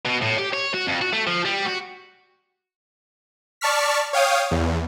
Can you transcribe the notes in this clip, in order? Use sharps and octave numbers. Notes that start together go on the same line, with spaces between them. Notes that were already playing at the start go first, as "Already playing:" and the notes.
B2
A2
G4
C#5
F#4
F2
F#4
A3
F3
G3
F#4
D5 A5 C#6 F6 B6
C#5 F5 G5 D#6
E2